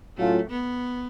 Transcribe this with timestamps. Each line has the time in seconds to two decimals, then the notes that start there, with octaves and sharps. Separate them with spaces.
0.17 A2 F#3 A3 C#4 F4
0.50 B3